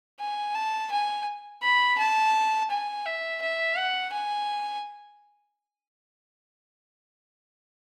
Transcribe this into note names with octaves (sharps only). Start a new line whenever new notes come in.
G#5
A5
G#5
B5
A5
G#5
E5
E5
F#5
G#5